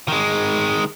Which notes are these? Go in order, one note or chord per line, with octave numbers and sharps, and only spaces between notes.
D#3 G#3